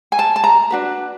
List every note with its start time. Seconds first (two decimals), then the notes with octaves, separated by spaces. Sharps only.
0.12 G#5
0.19 A5
0.36 A5
0.44 A#5
0.70 D4 F#4 B4